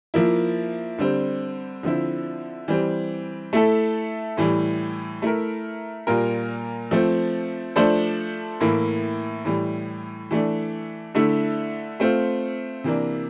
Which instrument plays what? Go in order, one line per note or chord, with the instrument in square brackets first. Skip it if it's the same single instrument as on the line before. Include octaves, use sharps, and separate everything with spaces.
[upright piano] F3 A#3 E4
D3 G3 C4
D3 F3 C4 E4
E3 G3 C4
A3 E4 A4
A2 E3 G3
A3 E4 A#4
A#2 G3 A#3 F4 A#4
F3 A3 C4
F3 A3 D4 A4 C5
A2 E3 A#3 E4
A2 E3 G3
E3 A3 D4
D3 A3 E4
A3 C4 F4
C3 E3 A#3 D4